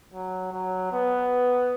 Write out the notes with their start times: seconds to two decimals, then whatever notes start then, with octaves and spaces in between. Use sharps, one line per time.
0.14 F#3
0.53 F#3
0.92 B3